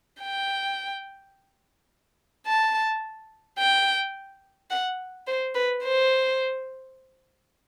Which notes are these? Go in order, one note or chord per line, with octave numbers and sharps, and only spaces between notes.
G5
A5
G5
F#5
C5
B4
C5